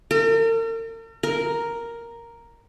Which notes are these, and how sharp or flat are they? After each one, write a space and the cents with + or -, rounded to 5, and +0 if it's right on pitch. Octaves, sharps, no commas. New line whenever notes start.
A#4 -45
A#4 +0